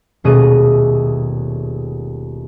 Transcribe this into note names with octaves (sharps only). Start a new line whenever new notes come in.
D#1 B2 A3 G#4 D#5 D#7